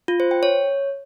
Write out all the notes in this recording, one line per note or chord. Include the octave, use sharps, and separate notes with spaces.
F4
C5
G5
C#5